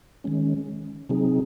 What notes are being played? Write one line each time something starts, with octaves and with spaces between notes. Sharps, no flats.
D#3 G#3 C#4
C3 F#3 C4 D#4 G#4